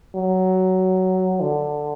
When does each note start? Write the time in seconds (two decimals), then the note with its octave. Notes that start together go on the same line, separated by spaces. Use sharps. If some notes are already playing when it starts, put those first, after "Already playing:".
0.15 F#3
1.42 D3